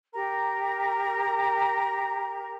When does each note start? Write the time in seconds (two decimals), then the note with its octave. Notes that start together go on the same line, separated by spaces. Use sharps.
0.13 G4 A#4 A#5